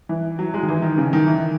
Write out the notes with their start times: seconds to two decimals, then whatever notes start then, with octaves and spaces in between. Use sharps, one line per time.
0.09 E3
0.39 F#3
0.54 G#3
0.63 D#3
0.68 E3
0.82 D#3
0.98 C#3
1.13 D#3
1.27 E3